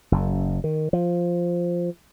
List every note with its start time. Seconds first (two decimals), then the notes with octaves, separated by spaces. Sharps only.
0.12 F#1 F#2
0.64 D#3
0.93 F3